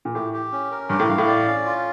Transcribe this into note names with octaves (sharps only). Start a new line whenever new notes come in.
A#2
A2 G4
G4
C#4
A#4
G2 G4
A2
G2 F5
A2
D5
C#4
F4